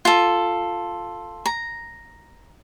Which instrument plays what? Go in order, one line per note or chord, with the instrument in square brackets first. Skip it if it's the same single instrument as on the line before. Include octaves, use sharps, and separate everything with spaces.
[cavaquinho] F4 A4
A#5